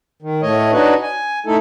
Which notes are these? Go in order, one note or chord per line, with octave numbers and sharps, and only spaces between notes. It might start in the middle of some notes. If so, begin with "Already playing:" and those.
D#3
A2 A3 C#5 D#5
D4 D#4 F#4 B4 C#5 D#5
G#5
A3 D#4 E4 A4